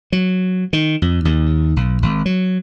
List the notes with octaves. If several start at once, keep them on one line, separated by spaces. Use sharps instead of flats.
F#3
D#3
F2
D#2
B1
G#1
F#3